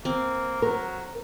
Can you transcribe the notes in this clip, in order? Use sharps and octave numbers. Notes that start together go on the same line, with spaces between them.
A#3 C4
F#3 A#4